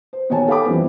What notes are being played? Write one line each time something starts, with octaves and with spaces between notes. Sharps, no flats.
C5
B2 D#3 C#5 G#5 A5
A4 F5 G5 B5 D6
F#2 E3 F3 G3 B3 C4